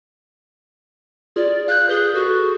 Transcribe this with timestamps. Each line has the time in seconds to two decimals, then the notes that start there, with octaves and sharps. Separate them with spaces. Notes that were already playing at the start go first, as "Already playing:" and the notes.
1.36 F4 G#4 D5
1.68 F5 F#6 G6
1.89 G#4 B4 G7
2.14 F#4 G#4 A4